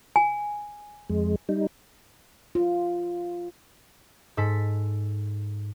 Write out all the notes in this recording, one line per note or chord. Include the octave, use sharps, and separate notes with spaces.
G#5
F2 G#3
G3 D#4
F4
G#2 A4 B6